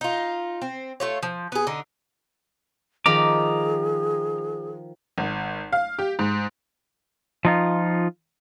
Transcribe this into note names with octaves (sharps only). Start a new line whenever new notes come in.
D#4 F4
C4
A3 F4 C#5
F3
B3 G#4
D3 D#4
D#3 F3 G#4 A#5 D6
G#1
F5
G4
G#2
F3 D#4 F4